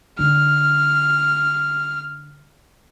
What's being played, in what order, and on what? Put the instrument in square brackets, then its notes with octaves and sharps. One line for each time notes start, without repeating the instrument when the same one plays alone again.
[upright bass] D3 [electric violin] F6